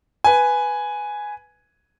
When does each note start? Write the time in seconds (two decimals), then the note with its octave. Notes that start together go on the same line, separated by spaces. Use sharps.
0.24 B4 G#5